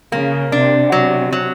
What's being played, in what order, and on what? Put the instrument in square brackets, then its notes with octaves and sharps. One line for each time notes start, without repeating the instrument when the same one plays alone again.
[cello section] C#3 [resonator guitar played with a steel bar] A#3
[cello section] C3 [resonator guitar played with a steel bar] D4
[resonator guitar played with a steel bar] F#3
F#3